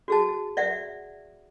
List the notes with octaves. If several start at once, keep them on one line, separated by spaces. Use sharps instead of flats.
F#4 G#4 A5
D5 E5 F#5